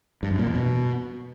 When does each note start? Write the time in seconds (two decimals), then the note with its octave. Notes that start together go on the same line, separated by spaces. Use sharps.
0.23 G2
0.31 F#2
0.39 A#2
0.47 E2
0.55 B2